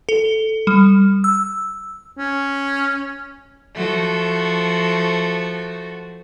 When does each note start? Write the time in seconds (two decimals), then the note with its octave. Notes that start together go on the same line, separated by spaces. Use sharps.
0.09 A4
0.67 G3
1.24 E6
2.17 C#4
3.74 F3 A3 F#4